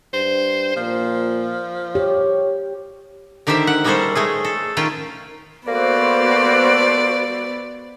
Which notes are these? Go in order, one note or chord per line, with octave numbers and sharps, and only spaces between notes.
G2 C5
A#2 F3
G4 C#5
D3 D#3 G4 C5 E5
F#5
G3 G#3 A#3 C#4 A4 C5
G#3 A3 G#4
A4
D#3 C#4 F4 G5
A#3 B3 F#4 A4 C5 D5